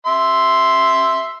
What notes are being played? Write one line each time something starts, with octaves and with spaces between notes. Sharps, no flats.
E5 C6